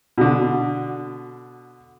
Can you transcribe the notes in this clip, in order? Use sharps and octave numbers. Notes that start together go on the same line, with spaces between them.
B2 D3